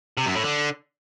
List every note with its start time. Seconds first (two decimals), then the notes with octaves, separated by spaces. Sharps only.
0.17 C3
0.26 F#2
0.35 A2
0.44 D3